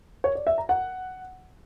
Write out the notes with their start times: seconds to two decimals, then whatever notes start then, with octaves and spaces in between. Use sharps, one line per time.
0.24 C#5
0.35 D5
0.47 E5
0.58 A#5
0.69 F#5